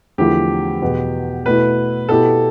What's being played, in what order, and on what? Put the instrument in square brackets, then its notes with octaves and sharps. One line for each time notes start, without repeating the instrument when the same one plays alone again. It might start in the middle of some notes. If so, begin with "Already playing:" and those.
[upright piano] E2 D3 F3 A3 E4 [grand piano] G4
[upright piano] E2 B2 B3
[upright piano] B2 A3 E4 [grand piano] B4
[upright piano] B2 B3 E4 G4 [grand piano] A4